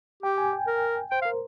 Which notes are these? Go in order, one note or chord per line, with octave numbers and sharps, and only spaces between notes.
G4 G5
G#5
G5
A#4
C5 G5
F5
A#4